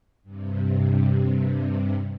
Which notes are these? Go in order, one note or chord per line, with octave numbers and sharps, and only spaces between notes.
G2 C3